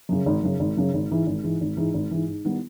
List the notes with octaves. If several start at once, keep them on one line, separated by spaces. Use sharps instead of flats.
F#2 C#3
G#1
F#2 C#3
G#1
F#2 C#3
G#1
G#2 E3
G#1
G#2 E3
G#1
G#2 E3
G#1
G#2 E3
G#2
D#3 G3 B3 E4